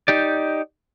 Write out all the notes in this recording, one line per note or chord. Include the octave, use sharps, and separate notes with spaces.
D#4 G4 D5